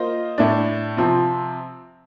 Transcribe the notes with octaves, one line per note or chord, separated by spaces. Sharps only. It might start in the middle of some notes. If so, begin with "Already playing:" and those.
Already playing: A#3 F4 C5 D#5
A2 A3 D4
C3 F3 C4